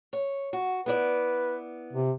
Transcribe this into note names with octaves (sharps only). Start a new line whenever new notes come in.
C#5
F#4
B3 E4 B4 D5
C3